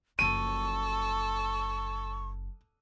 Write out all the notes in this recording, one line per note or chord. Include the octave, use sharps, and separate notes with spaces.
F#1 F3 A4 C#6 D#7